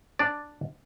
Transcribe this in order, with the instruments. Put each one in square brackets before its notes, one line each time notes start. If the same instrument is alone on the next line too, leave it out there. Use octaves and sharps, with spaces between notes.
[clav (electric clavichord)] D4 D5